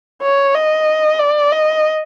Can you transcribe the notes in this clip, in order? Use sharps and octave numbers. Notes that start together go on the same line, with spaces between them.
C#5
D#5
D5
D#5